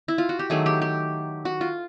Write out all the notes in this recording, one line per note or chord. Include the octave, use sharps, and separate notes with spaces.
E4
F4
F#4
G4
D#3 F#3 A3 G#4
G4
G4
F#4
F4